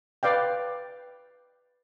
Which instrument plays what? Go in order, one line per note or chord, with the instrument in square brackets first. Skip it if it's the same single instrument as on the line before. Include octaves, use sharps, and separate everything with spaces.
[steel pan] B4 D5 F5 G5